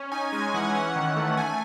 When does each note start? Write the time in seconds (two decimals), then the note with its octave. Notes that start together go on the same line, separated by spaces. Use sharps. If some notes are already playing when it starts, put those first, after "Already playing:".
Already playing: C#4
0.12 D#4 G#5
0.32 G#3 G#5
0.54 E3 F#5
0.74 C#4 F#5
0.96 D#3
1.16 A3
1.37 A3 G#5